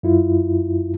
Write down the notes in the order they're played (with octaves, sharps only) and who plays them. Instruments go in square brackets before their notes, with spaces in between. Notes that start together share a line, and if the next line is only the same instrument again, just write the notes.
[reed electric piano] F#2 E4 F4